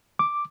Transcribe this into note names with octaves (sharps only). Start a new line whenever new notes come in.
D6